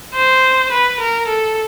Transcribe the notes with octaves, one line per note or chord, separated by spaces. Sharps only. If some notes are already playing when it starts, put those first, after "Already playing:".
C5
B4
A#4
A4